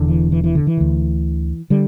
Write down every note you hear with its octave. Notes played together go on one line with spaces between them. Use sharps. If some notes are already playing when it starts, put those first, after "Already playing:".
Already playing: E1 E2 D3
E3
E3
E3
D3
E3
D2 D3
D3 G3